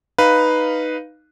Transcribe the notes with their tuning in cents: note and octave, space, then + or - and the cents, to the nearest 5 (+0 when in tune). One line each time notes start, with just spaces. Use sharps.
D#4 +0 B4 +0 F5 +0